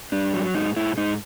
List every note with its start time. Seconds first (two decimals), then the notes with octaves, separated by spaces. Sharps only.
0.12 G2 D4
0.33 F#3
0.54 G#2 D#4
0.76 G#2 E4
0.97 G#2 D#4